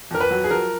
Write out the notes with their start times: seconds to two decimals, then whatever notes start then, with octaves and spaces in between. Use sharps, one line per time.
0.11 F2 A#4
0.20 B4
0.31 F#3
0.44 G#4
0.51 F3 A#4